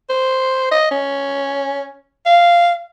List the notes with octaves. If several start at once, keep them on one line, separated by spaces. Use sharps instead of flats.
C5
D#5
C#4
F5